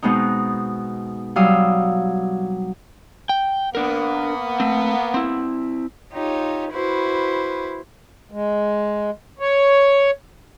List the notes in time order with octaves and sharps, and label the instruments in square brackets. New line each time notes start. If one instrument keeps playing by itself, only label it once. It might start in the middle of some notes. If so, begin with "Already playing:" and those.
[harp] B2 G#3 B3 C4 D#4
F#3 G3 F5 D#6 E6
[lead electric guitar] G5
[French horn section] A#3 B3 [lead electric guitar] D4 A#4
[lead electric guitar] A3 C4
C4 E4
[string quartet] D#4 F4 G4 C#5
E4 F#4 B4 C5
[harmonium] G#3
C#5